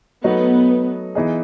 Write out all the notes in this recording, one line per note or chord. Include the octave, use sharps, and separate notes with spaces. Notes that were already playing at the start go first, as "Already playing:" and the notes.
F#3 A3 B3 D#4 F#4
E3 B3 D#4 G#4